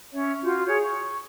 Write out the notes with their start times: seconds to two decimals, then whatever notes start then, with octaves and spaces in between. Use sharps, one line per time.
0.12 C#4 C#5 E5
0.43 F4 F#4 G6
0.67 G#4 C#5
0.82 C#6